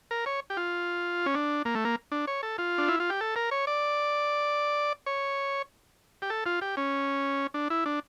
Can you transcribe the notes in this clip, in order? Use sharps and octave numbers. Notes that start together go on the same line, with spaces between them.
A#4
C#5
G4
F4
C#4
D4
A#3
A3
A#3
D4
C#5
A4
F4
D4
E4
F4
G4
A4
A#4
C#5
D5
C#5
G4
A4
F4
G4
C#4
D4
E4
D4